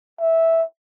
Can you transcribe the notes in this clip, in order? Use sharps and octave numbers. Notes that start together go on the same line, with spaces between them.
E5